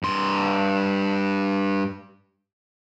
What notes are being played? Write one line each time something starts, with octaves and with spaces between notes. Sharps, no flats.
G2 C6